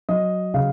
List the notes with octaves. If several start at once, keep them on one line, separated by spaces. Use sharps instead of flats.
F#3 D#5
C#3 F5